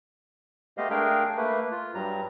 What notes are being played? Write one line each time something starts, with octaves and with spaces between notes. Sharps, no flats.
G#3 A3 B3 G4 D#5 F5
A3 D4 G#4 A#4 F5 G5
A3 A#3 B4
F4
G2 F#3 G3 A#5